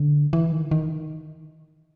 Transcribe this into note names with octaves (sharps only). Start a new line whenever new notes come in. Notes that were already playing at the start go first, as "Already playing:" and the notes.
Already playing: D3
E3
D#3
D#3